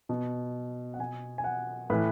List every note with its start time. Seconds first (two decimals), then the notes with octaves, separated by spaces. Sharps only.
0.09 B2
0.94 F#5
0.99 B2 G#5
1.38 G#5
1.44 F#5
1.90 A2 E3 B4